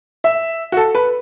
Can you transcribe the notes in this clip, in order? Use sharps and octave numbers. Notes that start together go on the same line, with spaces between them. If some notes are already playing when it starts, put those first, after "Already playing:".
E5
F#4
A4
B4